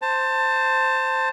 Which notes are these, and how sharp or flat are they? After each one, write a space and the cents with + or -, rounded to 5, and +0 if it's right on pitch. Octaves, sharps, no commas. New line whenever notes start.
C5 +0 A5 +20